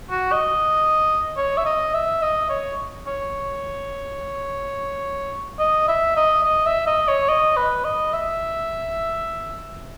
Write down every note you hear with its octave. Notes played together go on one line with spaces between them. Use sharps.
F#4
D#5
C#5
E5
D#5
E5
D#5
C#5
C#5
D#5
E5
D#5
D#5
E5
D#5
C#5
D#5
B4
D#5
E5